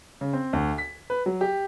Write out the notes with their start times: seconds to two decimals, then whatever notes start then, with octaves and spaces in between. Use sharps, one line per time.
0.21 C#3
0.33 C4
0.53 D2
0.78 B6
1.10 B4
1.26 F#3
1.41 G4